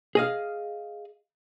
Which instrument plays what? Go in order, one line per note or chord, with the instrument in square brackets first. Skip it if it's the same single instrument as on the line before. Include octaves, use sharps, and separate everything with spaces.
[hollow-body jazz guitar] G#4 D#5 F5